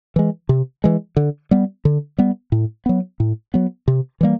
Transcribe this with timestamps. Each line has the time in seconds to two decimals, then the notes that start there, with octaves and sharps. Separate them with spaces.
0.16 E3 G#3
0.49 C3
0.84 E3 G#3
1.17 D3
1.51 G3 B3
1.85 D3
2.18 G3 B3
2.52 A2
2.86 F#3 B3
3.20 A2
3.54 F#3 B3
3.88 C3
4.21 E3 G3 A#3